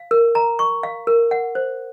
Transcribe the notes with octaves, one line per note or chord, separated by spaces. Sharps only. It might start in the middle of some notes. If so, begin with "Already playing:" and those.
Already playing: F5
A#4
A#5
C#6
F5
A#4
F#5
C5